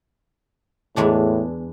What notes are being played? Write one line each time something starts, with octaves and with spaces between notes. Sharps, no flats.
E2 A2 G#3 D4